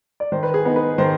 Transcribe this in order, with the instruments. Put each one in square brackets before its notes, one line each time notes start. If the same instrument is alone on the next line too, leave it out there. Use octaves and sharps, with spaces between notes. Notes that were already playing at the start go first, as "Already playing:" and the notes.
[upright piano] D5
D#3 C5
B4
G#4
B3 D#4
B4
D#3 C5